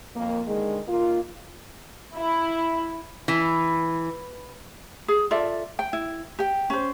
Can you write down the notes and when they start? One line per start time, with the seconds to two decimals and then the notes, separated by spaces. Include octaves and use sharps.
0.15 F2 A#3
0.47 D3 D#3 G#3
0.88 D#3 A#3 F4
2.15 E4
3.28 E3
5.08 G#4
5.31 F4 A4 D5 E5
5.79 G5
5.93 E4
6.39 G4 G5
6.70 C#4 C5